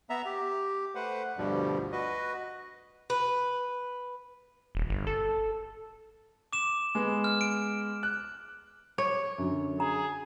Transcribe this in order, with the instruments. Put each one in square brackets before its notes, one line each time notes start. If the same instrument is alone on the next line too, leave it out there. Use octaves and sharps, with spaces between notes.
[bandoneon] B3 E5 A#5
G4
A3 B4 C5 F#5
D2 G2 B2 F3 G3
F#4 B4 D#5
[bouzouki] B4
[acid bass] D#1
G1
A4
[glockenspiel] D6 E7
[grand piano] G#3 B3
[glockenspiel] F6
D7
[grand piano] F#6
[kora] C#5 [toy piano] D6
[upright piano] F#2 D3 F#3
[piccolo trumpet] G#4 [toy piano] A#5